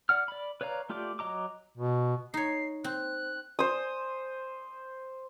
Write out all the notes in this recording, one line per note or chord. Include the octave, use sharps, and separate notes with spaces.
D5 F#5 F6
D5 B5
B4 C#5 D5 F5 A#5
A3 F4 G4 D5 D6
F#3 D#5 A#5 D6
B2
D#4 C#5 C7
C4 F#6
C5 D#6